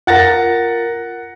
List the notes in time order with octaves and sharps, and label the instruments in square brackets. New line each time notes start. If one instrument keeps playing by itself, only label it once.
[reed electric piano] F4 A#4 [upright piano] F#5 A6 A#6